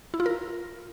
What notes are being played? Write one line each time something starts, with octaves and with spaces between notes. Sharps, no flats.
E4
F4
A#4